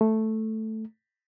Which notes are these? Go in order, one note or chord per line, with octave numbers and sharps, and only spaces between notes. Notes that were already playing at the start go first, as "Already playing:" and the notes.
A3